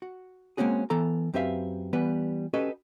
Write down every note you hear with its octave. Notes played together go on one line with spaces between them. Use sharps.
F#4
G#3 A#3 C4 C#4 F#4 G#4
E3 B3 A4 A#5
F#2 C4 G4 B4 E5 F5
E3 G3 B3 B4
C#4 F#4 G4 A4 B4 D#5